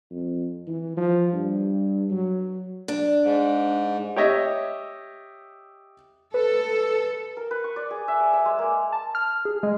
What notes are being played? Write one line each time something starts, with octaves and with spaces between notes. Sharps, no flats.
F2
E3
F3
G2
F#3
D4
G#2
G4 C#5 D#5 E5
A4 B4
A#4
B4
C#6
D5
G#4
E5
D5
E5
G#3
A#3
A5
F6
G#4
G#3